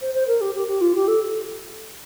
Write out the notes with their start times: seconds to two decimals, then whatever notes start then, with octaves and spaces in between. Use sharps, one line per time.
0.01 C5
0.14 C5
0.27 A#4
0.41 G4
0.54 G4
0.67 G4
0.81 F4
0.95 G4
1.07 A4